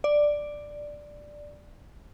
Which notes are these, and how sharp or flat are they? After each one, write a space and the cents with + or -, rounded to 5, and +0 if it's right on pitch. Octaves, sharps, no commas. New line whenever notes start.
D5 +5